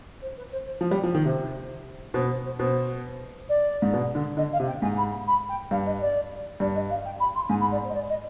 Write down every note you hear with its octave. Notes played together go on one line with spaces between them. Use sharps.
C5
B4
C5
C5
F3 C5
G3
F3
D#3
C3 C5
B2 C5
C5
C5
B2 C5
D5
G#2
B2
D3
D3 D#5
F5
C3
G5
G#2 G#5
B5
B5
G5
G2 F5
D#5
D5
G2 D5
D#5
F5
G5
B5
C6
G#2 G#5
B5
D5
C5
D#5
D5
D#5